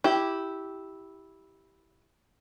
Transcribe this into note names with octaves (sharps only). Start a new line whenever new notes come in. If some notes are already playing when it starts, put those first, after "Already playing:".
E4 G4